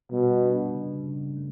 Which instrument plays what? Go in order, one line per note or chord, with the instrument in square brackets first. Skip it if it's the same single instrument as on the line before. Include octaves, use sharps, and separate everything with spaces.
[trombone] B2 [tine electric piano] G3
[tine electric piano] D4
C#3
C#3
A3